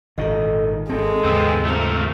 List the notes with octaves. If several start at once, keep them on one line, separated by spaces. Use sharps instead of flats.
G#1 A#2 D#3 A4 D#5
G#1 D#3 G#3 C4 A4
D#2 G#2 C#3 B3 C4
A3 C4 F4 A#4